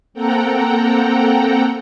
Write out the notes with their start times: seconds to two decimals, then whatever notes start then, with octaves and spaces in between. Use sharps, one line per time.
0.14 A#3 C4 A4 F#5 G5 A#5